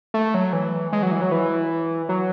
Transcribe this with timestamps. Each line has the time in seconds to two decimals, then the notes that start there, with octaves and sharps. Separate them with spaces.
0.14 A3
0.34 F#3
0.53 E3
0.93 G#3
1.03 F#3
1.11 E3
1.22 F#3
1.32 E3
2.09 F#3